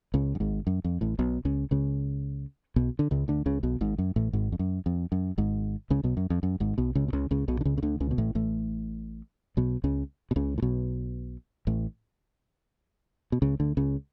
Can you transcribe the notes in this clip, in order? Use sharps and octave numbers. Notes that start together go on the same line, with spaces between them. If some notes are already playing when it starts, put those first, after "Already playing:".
C#2 C#3
F#2
G#1 G#2
F#2
F2
A1 A2
B1 B2
C#2 C#3
C#2 C#3
B1 B2
D3
C#2 C#3
D2 D3
C#2 C#3
B1 B2
G#1 G#2
F#2
A1 A2
G#1 G#2
F2
F#2
F2
F#2
G#1 G#2
C#2 C#3
B1 B2
F#2
F2
F#2
G#1 G#2
B1 B2
C#2 C#3
B2
C#2 C#3
C#2 C#3
B1 B2
D3
C#2 C#3
C#3
D2 D3
C#2 C#3
B2
A1 A2
A1 A2
B1 B2
C#2 C#3
B2
C#2 C#3
A2
B1 B2
A1 A2
B2
C#2 C#3
D2 D3
C#2 C#3